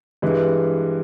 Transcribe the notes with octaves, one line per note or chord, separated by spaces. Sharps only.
G2 E3 G#3